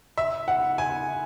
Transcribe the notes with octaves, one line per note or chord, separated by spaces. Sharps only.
E5
F#5
G#5